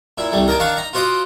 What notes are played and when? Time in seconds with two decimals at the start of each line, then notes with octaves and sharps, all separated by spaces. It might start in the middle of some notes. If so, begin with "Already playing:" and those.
0.18 A#2 E4
0.32 C2 G3 A3
0.47 D#2 A#4 D#5 A5 D6
0.59 D#3 D4 F5 F#5 A5 C#6
0.77 D#4 A#5
0.93 F4 F#4 C5 D#5 D6 D#6